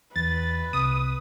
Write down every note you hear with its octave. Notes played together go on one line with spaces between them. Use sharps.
E2 B4 A6
C2 D#6